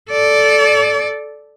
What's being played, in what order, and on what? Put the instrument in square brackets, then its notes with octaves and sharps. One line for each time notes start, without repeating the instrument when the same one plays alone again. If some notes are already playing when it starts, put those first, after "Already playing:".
[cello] A4 D5